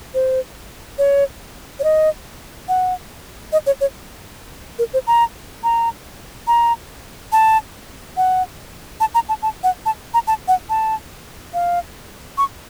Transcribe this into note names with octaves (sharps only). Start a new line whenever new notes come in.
C5
C#5
C#5
D#5
F#5
D#5
C#5
C#5
A#4
C5
A#5
A#5
A#5
A5
F#5
A5
A#5
A5
A5
F#5
A5
A#5
A5
F#5
A5
F5
C#6